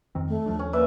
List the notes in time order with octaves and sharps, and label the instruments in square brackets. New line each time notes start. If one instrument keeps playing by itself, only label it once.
[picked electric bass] F2 D#3 C4
[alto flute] A3
[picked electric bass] D#2 F3 D4
[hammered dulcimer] C#4
[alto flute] A#3 [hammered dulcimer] B4 D5 E5